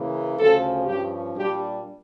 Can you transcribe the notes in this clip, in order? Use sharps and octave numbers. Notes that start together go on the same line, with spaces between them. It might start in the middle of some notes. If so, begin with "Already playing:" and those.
Already playing: C#3 E3 A#3
D2 C#3 F3 C#4 A4
G2 F3 C#4 G4
A#2 G3 D4 G4